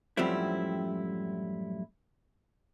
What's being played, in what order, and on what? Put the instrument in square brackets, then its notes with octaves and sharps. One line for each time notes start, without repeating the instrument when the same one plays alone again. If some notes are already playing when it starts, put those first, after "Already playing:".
[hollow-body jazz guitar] F#2 A2 F3 G3 C4 E4